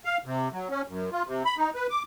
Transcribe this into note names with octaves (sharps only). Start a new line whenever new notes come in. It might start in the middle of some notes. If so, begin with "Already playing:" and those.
F5
C3
F#3
C#4
F#2
F4
C3
B5
D#4
B4
D6